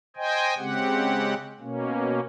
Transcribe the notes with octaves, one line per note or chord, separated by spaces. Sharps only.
C5 D#5 G5 G#5
C#3 G#3 C4 G4 F#5
B2 A#3 C#4